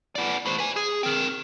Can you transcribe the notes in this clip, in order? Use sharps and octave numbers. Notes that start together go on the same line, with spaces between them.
B3 D5
A2 C5
B4 G#5
G#4
C4 A#4